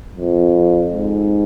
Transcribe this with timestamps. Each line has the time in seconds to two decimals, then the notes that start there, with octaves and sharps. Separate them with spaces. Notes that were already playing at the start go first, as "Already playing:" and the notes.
0.17 F2
0.92 G#2